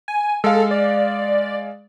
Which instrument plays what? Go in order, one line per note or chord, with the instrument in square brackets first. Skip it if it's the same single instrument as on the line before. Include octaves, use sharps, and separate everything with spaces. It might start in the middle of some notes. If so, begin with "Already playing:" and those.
[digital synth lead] G#5
[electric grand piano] G#3 F5 [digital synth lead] A4
[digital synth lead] D5